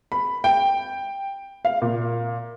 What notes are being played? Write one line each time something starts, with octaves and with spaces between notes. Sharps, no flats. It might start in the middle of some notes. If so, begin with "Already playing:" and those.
B5
G5
F5
A#2